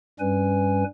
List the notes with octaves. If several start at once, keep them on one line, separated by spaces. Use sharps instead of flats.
G2 G3 C#4 B4 G#5